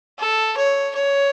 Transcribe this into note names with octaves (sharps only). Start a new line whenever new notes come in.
A4
C#5
C#5